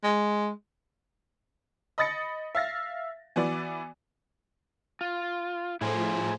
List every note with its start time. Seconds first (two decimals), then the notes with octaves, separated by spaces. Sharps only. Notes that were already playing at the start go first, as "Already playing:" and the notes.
0.04 G#3
1.98 D#5 B5 D#6 A6 A#6 C#7
2.55 E5 F5 A6 A#6
3.36 E3 B3 F#4 D5
5.01 F4
5.81 A2 F3 E4 G#4 C5